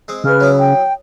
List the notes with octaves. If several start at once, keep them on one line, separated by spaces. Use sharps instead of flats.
G#3 C4
C#3 B4 F6
F#3 B3 E4
G5